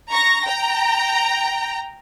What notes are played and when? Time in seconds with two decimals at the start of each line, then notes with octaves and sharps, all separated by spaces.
0.10 A#5 C#6 A#6
0.45 G5 A#5